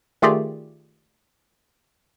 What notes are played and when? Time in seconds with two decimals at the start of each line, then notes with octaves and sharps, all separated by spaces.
0.22 D#3 A3 F4 G4 G#4 D5